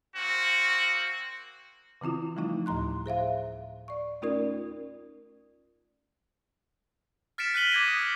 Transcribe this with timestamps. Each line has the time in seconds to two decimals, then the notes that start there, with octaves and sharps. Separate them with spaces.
0.15 A#3 C4 F#4
2.01 C#3 E3 C4 E4 F4
2.37 F3 G3 A3 D#4 E4
2.66 D2 A2 A#5 C6 F#6
3.06 G#4 C5 E5 F5
3.88 D5 C#6
4.22 A3 C#4 D#4 F4 A#4 D5
7.38 F6 A6 B6 C#7 D7 E7
7.54 F6 F#6 B6 D#7 F#7 G7
7.72 D6 G6 G#6 A#6 D#7
7.86 D6 D#6